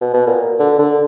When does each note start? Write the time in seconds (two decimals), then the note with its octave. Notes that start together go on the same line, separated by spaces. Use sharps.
0.01 B2
0.14 B2
0.27 A#2
0.59 D3
0.79 D3